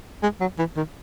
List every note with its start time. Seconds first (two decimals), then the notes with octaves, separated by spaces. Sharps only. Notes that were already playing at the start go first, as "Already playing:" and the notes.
0.23 G#3
0.40 F#3
0.58 E3
0.77 D#3